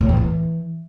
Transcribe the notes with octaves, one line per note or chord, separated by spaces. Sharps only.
A2
E2
E3